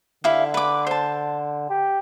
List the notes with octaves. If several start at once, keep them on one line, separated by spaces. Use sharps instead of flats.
D3 E4 G4 F5
B4 D6
C5 A5
G4